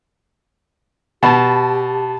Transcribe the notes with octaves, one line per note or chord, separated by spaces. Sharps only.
B2 G4 A5 B5